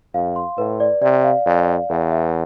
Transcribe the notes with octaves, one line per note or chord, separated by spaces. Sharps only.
F2 F5
C6
A2 B4
D5
C3 D5
F5
F2 D5
F5
E2 B4
E5